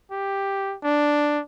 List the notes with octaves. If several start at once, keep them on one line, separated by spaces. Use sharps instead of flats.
G4
D4